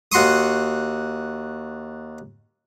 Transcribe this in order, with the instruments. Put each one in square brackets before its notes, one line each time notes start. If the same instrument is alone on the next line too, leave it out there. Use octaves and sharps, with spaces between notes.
[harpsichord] D#2 F#4 C6 C#6 D#6